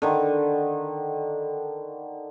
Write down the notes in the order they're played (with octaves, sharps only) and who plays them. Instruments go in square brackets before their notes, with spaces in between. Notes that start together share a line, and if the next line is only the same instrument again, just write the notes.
[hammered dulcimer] D3 D#3